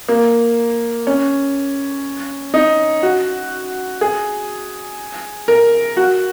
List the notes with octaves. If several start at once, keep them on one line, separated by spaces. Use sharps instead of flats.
A#3
C#4
D#4
F#4
G#4
A#4
F#4